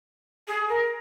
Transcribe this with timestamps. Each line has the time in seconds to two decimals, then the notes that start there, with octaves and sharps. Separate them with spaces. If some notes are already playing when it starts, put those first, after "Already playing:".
0.48 G#4
0.69 A#4